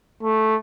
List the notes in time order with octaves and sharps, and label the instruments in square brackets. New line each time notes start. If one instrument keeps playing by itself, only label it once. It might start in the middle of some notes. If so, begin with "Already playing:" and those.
[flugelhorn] A3